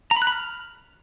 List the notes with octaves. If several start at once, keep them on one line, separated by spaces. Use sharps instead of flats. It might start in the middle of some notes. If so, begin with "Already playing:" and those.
A#5
B5
F#6
B5
F6